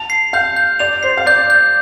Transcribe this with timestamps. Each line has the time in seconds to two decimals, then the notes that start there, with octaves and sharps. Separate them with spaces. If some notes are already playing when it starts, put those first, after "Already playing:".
Already playing: A5 F7
0.10 C7
0.33 F5 G6
0.56 G6
0.79 D5 F7
1.03 C5 C7
1.17 F5
1.26 D5 G6
1.50 G6